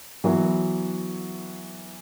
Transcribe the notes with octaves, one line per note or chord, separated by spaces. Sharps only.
E3 F#3 B3